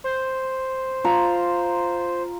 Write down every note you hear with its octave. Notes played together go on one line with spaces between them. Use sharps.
C5
F4 A#5